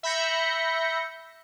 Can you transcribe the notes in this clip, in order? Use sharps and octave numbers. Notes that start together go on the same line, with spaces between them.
E5 B5 G6 A#6 C#7